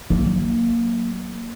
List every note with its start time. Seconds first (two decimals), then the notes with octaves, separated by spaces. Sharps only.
0.10 F#3 A#3